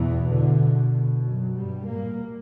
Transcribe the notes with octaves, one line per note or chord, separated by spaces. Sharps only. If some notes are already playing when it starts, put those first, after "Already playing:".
Already playing: E2 B2 E3
D3
F#2 F#3
G2 G3
A#2 A#3